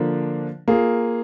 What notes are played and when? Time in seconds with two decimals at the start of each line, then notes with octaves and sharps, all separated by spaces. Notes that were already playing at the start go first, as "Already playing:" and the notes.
Already playing: D3 F3 A#3 D4
0.68 A#3 F4 G#4